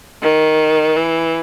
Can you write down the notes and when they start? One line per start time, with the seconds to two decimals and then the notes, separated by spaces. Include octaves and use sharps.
0.22 D#3
0.96 E3